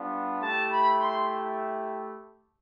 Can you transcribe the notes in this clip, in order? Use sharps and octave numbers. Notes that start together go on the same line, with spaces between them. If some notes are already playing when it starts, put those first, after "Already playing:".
Already playing: G3 B3 D4 F4
A3 E4 G4 A5
B5
C6